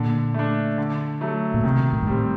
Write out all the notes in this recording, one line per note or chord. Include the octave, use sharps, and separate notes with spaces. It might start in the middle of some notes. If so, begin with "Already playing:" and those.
Already playing: A#2 D3
A3 D4
D3
F#3 A3
A#2
C3 D#3
A2
G2
A2 G3 C4